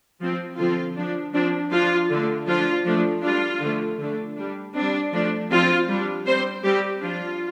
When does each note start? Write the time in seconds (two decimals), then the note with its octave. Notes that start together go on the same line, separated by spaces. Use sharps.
0.20 F3 C4
0.57 D3 F3 C4 F4
0.96 F3 D4
1.33 F3 C4 D4
1.71 F3 D4 F4
2.09 D3 A3 D4
2.47 F3 D4 F4
2.85 F3 A3 D4
3.23 G3 D4 F4
3.61 D3 F3 A3
3.98 D3 A3 D4
4.36 G3 D4
4.75 G3 C4 D4
5.12 F3 A3 D4
5.50 F3 C4 F4
5.88 G3 D4
6.26 G3 C4 C5
6.64 G3 C4 G4
7.01 F3 D4 F4